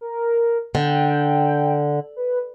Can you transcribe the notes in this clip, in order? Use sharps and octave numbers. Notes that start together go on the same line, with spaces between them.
A#4
D3 G5
B4